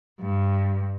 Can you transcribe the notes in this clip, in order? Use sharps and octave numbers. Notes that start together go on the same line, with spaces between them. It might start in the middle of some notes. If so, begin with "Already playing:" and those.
G2